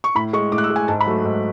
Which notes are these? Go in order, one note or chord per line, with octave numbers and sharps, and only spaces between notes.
C#6
A2 B5
G#3 C#6
A2 D6
F#6
E6
G#3
G#5
G#2 A5
B5
F#3 A3
G#2